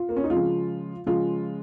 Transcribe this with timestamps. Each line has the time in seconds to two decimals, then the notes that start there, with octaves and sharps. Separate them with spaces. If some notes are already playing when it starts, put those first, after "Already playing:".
Already playing: F4
0.09 A#3
0.17 C#4
0.24 D#4
0.30 C#3 F3 G#3 F4
1.06 C#3 F3 G#3 F4